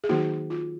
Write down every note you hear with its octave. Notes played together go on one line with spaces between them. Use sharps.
G#4
D#3 F#3 A#3 D#4 F#4
F4